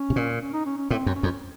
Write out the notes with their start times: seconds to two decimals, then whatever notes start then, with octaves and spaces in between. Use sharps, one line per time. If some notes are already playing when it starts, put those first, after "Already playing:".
Already playing: C#4
0.10 C3
0.16 A#2
0.42 C#4
0.53 D#4
0.66 C#4
0.78 C#4
0.91 A2 C4
1.06 F#2
1.15 C#4
1.23 F2